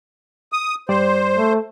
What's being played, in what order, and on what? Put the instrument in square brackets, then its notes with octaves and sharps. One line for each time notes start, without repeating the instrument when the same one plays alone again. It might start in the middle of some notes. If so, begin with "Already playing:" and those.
[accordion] D#6
[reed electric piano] G2 G3 D5 [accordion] C5
[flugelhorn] A3